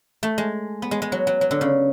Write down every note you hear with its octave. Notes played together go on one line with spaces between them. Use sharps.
A3
G#3
B3
G#3
G#3
F#3
F#3
F#3
D3
C#3